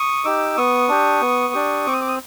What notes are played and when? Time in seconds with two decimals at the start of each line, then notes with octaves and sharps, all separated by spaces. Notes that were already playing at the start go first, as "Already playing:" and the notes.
Already playing: C#6 D#6
0.24 D#4 G4 D6 E6
0.57 B3 C#6 D#6
0.89 D4 G4
1.22 B3
1.54 D4 G4
1.86 C4 D6
1.93 D#6
2.01 D6
2.08 D#6